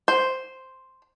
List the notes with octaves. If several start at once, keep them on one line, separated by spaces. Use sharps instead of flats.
C5